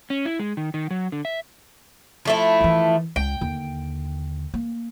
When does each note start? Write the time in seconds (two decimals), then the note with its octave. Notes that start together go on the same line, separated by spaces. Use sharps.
0.10 C#4
0.25 E4
0.39 G#3
0.57 D#3
0.74 D#3
0.91 F#3
1.12 D3
1.25 E5
2.25 F3 A3 E4
2.61 D#3 E3
3.16 C#2 G5
3.41 D#2 D3
4.54 A#3